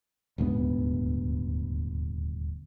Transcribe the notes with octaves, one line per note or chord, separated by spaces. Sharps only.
D#1 D2 G#2 B3